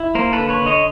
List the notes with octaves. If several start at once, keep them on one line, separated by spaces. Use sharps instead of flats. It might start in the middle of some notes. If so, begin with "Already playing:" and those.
Already playing: E4
A#3 A#4 C5
A4 B4
D3
B4 C#5
D3
C#5 D#5